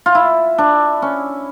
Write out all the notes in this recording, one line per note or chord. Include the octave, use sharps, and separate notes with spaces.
F4
E4
D4
C#4